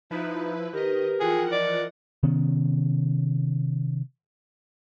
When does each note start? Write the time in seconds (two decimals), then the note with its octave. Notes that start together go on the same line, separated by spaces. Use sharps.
0.11 F3 D#4 E4 B4
0.73 D#3 G4 A#4 B4 D#5
1.20 E3 F3 F4 G#4 F#5 G5
1.52 D5 D#5
2.23 C3 D#3 B3 C#4